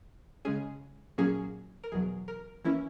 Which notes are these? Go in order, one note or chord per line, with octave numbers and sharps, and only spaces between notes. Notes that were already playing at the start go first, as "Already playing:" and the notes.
C#3 G#3 C#4 G#4
A#2 F#3 A#3 C#4 G#4
A#4
E2 B2 F#3 G#4
A#4
E3 A#3 C#4 E4